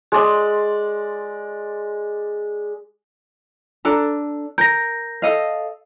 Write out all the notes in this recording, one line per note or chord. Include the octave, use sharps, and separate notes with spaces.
G#3 D5
D4 A4 A#5
A#4 G6 A#6
A4 D#5 F5